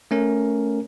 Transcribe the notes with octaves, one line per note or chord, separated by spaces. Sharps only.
A3 C#4 A#4